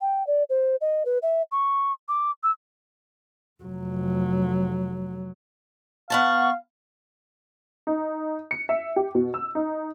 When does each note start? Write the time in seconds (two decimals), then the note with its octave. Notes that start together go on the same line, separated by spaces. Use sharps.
0.01 G5
0.27 D5
0.49 C5
0.81 D#5
1.05 B4
1.22 E5
1.52 C#6
2.09 D6
2.43 E6
3.63 F1 F#3
6.10 B3 F5 F#5 A5 C#6 F6
7.87 D#4
8.51 C#7
8.69 E5
8.96 G4
9.15 B2
9.34 E6
9.55 D#4